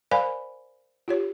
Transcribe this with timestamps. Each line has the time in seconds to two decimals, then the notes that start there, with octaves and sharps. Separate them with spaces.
0.11 A#4 C5 D5 F5 G#5 B5
1.08 F4 G4 C#5